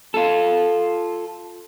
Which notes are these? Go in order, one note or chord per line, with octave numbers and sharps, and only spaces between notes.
F4 A4